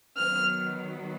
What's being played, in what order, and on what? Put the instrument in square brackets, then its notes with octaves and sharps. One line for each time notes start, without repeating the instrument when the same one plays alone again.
[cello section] D#3 F#3 B3 [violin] F6